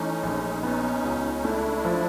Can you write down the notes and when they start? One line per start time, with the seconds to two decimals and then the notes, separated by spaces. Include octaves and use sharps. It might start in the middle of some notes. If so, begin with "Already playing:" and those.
Already playing: E3 A3 C#4 D#4
0.23 A#1
0.63 B3 C#4 D#4
1.04 C#2
1.39 D#4
1.44 A3 D4 E4
1.85 F3